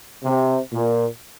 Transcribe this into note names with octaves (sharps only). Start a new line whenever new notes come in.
C3
A#2